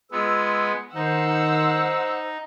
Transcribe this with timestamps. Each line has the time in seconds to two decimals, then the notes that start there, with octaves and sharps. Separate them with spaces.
0.12 G#3 B3 F4 E6
0.95 D#3 D#4 C5 F#5 E6
1.27 D#4